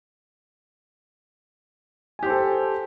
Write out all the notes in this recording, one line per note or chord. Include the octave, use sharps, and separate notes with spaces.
G4 A4 C5 G#5